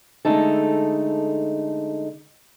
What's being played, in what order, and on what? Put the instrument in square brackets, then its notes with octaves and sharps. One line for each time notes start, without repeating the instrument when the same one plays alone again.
[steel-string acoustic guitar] D3 G#3 A3 D#4 A4